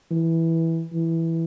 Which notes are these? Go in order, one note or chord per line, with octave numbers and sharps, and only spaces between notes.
E3
E3